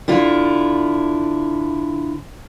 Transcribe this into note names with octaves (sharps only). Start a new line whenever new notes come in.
D3 E4 F4